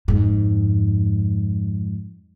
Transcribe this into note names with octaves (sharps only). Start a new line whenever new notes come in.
F2 G#2